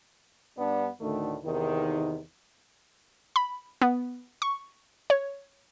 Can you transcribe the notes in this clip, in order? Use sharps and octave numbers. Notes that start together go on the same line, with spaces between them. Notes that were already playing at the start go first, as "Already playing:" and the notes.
G2 B3 D4
D2 A2 D3 D#3 A3
E2 C3 D#3
B5
B3
C#6
C#5